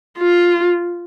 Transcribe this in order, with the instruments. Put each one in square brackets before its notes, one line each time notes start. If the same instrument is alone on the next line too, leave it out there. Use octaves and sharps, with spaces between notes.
[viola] F4